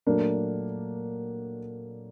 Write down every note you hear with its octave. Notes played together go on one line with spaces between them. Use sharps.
A#2 F#3 A3 A#3 D4